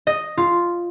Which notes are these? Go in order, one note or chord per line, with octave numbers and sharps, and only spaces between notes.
D#5
F4